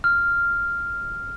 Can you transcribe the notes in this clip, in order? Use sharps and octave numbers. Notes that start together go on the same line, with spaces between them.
F6